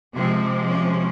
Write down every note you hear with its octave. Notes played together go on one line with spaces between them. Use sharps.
C3 F3 G#3 C4
C#4